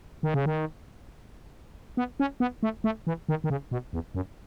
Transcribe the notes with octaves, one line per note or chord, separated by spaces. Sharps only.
D#3
C#3
D#3
B3
C#4
B3
A3
A3
E3
D#3
D#3
C#3
B2
E2
F#2